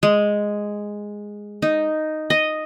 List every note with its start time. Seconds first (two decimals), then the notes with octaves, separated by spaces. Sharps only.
0.03 G#3
1.62 D#4
2.30 D#5